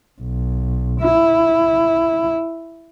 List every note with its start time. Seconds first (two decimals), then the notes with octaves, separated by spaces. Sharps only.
0.20 B1
1.00 E4